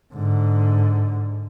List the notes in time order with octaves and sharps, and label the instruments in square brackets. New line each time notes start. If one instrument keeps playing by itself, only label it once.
[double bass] G#2 D3